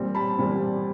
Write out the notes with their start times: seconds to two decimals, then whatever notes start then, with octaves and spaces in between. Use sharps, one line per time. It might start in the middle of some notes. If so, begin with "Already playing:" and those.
Already playing: A#2 G3 C4
0.15 A5 B5
0.38 A#2 G3 C4